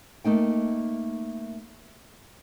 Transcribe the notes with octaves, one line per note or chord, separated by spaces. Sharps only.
A3 A#3 D#4 G5